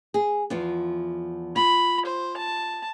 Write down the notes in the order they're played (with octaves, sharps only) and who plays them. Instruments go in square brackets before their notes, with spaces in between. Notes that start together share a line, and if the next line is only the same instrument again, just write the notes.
[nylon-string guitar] G#4
E2 F3 F4
[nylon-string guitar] F4 [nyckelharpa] B5
[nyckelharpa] C5
A5